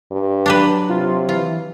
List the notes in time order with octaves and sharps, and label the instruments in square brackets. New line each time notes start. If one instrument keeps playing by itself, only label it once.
[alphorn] G2
[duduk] F#3 [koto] D4 G4 B4
[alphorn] C3 [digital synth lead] F4
[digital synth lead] E3 [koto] F4